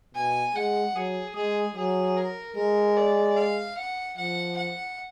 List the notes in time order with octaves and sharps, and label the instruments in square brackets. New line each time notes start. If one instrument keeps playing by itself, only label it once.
[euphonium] B2 [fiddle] G#5
[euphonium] G#3 [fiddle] F#5
[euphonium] F#3 [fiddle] G#4
[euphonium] G#3 [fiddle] G#4
[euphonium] F#3 [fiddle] G#4
[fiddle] A#4
[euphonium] G#3 [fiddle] A#4
[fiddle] D5
F5
F#5
[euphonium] F3 [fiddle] F#5
[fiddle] F#5